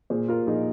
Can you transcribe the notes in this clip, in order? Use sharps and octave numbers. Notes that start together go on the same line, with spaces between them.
A#2 G#4 C5
F4 A#4
A#1 D#4 G#4